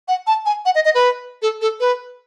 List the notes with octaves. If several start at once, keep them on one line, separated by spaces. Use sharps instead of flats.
F#5
A5
G#5
F#5
D#5
D#5
B4
A4
A4
B4